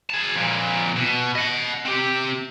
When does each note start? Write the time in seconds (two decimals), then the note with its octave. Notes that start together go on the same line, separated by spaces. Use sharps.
0.10 G#4 A5
0.35 F2 A#2
0.96 B2
1.35 D#5 F#5
1.86 C4 G4